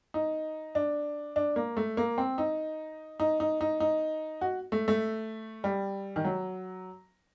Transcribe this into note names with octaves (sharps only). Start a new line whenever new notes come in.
D#4
D4
D4
A#3
A3
A#3
C4
D#4
D#4
D#4
D#4
D#4
F#4
A3
A3
G3
D#3
F#3